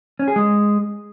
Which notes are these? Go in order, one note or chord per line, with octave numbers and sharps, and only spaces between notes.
C#4
G#4
G#3